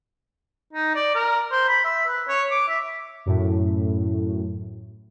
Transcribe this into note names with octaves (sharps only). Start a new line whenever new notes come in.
D#4
D5
A#4
C5
B5
E5
B4
C#5
D6
E5
F#2 A2